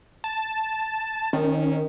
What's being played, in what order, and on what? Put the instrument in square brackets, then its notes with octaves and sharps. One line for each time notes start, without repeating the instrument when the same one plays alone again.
[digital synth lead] A5
[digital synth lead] D#3 [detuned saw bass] C#4